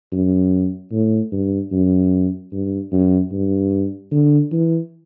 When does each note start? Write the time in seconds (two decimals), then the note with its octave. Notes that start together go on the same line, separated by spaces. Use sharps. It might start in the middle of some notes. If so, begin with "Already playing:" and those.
0.12 F#2
0.92 A2
1.32 G2
1.72 F#2
2.52 G2
2.92 F#2
3.31 G2
4.11 D3
4.52 E3